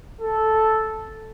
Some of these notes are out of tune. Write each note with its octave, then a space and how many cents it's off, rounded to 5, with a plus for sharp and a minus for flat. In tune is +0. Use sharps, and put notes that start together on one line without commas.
A4 -5